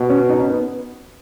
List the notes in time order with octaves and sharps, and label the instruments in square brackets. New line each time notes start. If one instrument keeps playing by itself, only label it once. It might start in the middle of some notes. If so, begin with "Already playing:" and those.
Already playing: [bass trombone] B2
[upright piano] C#4
D#4
C#4
B3